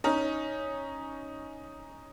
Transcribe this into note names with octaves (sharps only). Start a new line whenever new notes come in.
C#4 D#4